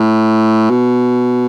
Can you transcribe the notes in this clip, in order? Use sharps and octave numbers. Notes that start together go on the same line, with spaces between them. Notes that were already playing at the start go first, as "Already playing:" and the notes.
Already playing: A2
B2